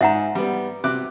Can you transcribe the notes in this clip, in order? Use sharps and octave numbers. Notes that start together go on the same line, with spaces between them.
G#2 E5 F#5 A#5
G3 B3
C3 D6 F#6